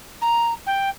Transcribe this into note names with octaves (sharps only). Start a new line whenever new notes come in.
A#5
G5